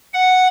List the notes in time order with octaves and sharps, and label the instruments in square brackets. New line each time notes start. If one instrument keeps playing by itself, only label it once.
[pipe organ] F#5